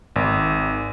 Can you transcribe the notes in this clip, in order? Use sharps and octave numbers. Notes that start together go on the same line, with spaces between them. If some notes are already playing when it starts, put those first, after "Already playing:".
G#1